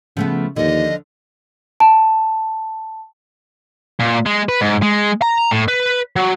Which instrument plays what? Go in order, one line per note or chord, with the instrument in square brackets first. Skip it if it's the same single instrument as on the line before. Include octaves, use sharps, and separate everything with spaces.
[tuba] C#3 [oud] F3 A3 B3
[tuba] D#2 [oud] D3 F3 [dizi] D#5
[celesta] A5
[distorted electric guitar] A#2
G#3
B4
G#2
G#3
A#5
A2
B4
F#3